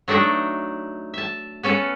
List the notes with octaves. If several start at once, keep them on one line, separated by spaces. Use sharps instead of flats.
F#3 A3 D4 D#4 E5
E5 A5
B3 C#4 A4 B4